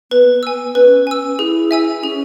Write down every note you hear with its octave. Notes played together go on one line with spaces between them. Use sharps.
B3 B4
B3
G#5 E6
C#4 B4
G#5 E6
E4 G#4
E5 G#5 E6
C#4 G#4